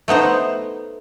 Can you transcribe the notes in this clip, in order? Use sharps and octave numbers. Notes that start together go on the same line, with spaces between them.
A3 B3 D#4 C5